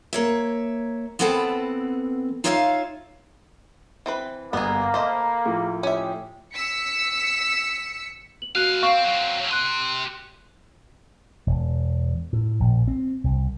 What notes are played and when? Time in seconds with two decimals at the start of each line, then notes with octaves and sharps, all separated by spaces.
0.13 A#3 C#5 E5
1.19 E3 B3 C4 A4 F#5 G5
2.44 D#4 F4 C#5 D5 E5 F5
4.06 E3 C4 B4
4.53 G1 A#3 B3 G#4
4.94 A3 C5 D#5 B5
5.46 A2 F3
5.83 G#3 C#4 G4 E5
6.54 E6 B6 C#7
8.42 F#7
8.55 F#2 F#4 F5 F#6 D#7
8.83 C4 F5 C#6
9.05 F#3 C4
9.51 G4 C6 F#6 D#7
11.47 E1
12.33 A2
12.60 A#1
12.88 C4
13.24 C2